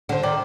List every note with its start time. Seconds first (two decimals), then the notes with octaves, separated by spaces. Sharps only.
0.09 D3 C5
0.23 D#3 D5